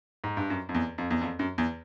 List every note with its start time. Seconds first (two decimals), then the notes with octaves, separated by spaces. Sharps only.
0.24 G#2
0.37 G2
0.50 F#2
0.69 F2
0.75 E2
0.98 F2
1.10 E2
1.21 F2
1.39 F#2
1.58 E2